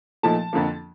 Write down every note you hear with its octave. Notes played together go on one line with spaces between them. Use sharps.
A#2 F3 A3 D#4 A5
F2 D3 F3 A#3